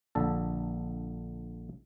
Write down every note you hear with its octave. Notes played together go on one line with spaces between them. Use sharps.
A#1 D3 A4